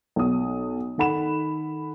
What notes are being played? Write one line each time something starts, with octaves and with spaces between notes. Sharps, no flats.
B1 D#6
D#3 A4 F#5 B5 E7